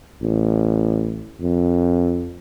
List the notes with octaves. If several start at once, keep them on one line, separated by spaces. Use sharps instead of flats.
A1
F2